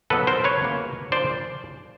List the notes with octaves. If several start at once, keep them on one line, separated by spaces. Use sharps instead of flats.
C#2 B2 F#3 B3 D#4 A4 B4
A#4 C5
B4 C#5
C#2 C#3 F#3 A#3
C#3 F3 A#3 D4 F4 C5 D5